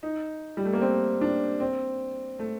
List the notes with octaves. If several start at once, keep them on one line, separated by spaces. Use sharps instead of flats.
D#4
G3
A3
A#3
C4
D4
C4
A3